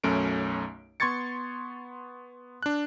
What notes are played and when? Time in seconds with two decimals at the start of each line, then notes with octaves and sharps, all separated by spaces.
0.04 B1 F#2 A3 C#4 D7
1.00 B3 C6 C#6 G#6 A6 C#7
2.63 D4 F#6